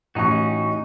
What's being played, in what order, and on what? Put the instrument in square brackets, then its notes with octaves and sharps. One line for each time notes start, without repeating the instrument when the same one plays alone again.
[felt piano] A1 C#6 [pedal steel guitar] C#4 D#4 F#4